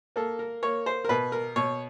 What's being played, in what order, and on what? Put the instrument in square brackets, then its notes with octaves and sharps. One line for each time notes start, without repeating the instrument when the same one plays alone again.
[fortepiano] A#3 A4
A#4
A#3 C#5
C5
A#4
B2 B4
A#4
B2 C#5